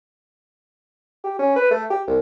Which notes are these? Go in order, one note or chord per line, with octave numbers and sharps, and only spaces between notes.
G4
C#4
B4
A3
G4
C2